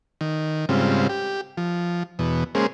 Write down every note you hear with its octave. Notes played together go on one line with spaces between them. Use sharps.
D#3
G#2 C#3 G3 C4 F4
G4
F3
E2 B2
G#3 A#3 C#4 G#4 C5